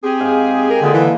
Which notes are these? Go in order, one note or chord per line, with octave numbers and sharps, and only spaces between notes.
C4 G4 G#4
G#2 F5 G#5
A#4
A#2 D3 G#3
E3